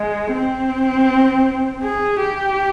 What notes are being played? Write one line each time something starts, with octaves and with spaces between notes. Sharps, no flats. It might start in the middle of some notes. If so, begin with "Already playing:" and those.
Already playing: G#3
C4
G#4
G4